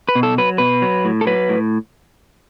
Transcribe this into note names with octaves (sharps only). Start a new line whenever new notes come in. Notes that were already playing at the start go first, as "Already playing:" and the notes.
B4
B2
A4
F#3 B4
B2 B4
F#3
A2
A4
F#3 B4
A2